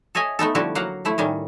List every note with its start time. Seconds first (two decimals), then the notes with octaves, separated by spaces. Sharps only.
0.15 A4 C#5 D#5 E5 G#5
0.39 A3 B3 D#4 A4
0.55 D3 F3 G3 E4 F#4 A4
0.75 F#3 A#3 F5 F#5
1.05 F3 A3 E4
1.18 A2 D#3 G3 C#4